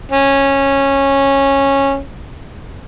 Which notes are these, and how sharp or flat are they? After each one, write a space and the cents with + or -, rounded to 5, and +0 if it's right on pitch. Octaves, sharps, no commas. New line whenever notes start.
C#4 -15